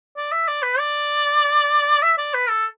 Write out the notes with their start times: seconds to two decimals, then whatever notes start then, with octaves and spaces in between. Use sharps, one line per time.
0.17 D5
0.32 E5
0.48 D5
0.63 B4
0.79 D5
2.03 E5
2.18 D5
2.34 B4
2.49 A4